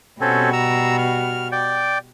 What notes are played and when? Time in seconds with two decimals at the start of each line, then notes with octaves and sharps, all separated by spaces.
0.21 B2 G3 C4 C#4 F#4 A4
0.53 A#5 E6
0.98 F6
1.52 D5 G5